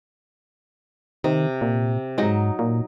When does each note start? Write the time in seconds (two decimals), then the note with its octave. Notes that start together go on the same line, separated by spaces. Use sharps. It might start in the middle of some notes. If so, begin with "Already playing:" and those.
1.24 C3 D#3
1.61 A#2
2.18 G#2 F#3 D#4
2.59 A#2